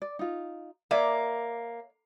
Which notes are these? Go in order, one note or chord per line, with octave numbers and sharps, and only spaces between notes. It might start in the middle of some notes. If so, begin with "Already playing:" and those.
D5
D#4 F4
A#3 C#5 D5 E5